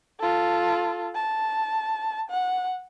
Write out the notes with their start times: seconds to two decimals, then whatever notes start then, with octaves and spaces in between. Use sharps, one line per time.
0.20 F4 A4
1.15 A5
2.31 F#5